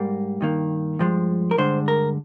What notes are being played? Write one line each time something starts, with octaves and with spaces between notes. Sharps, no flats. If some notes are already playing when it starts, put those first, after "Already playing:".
Already playing: G#2 G3 A#3
G2 D#3 A#3
G2 F3 G#3
A#4
G2 D3 G#3 C5
A#4